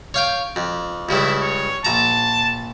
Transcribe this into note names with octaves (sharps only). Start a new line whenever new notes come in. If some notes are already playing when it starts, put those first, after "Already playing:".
C#5 F5 G5
F2
C#2 G2 C#3 E4
C#5
A#1 A5 A#5